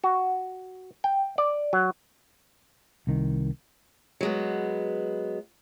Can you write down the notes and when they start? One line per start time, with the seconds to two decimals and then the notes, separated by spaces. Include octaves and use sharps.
0.04 F#4
1.04 G5
1.38 D5
1.73 F#3
3.07 C2 D#3
4.21 F#3 G#3 B3